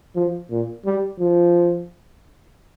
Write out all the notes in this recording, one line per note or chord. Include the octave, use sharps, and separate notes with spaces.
F3
A#2
G3
F3